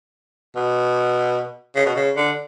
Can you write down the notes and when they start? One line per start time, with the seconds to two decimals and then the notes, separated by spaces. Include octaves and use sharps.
0.56 B2
1.76 C#3
1.86 B2
1.95 C#3
2.17 D3